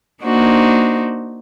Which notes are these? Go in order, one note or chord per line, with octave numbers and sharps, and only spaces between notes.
A#3 D4 D#4 F#4 C5